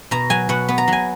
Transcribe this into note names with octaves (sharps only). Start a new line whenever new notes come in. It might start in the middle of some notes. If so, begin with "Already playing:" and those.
B2 A#5
F#3 G#5
B2 F#5
B3
A#5
F#3 G#5